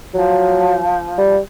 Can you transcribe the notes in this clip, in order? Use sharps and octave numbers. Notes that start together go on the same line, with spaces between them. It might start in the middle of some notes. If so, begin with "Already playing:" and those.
F3 F#3
G3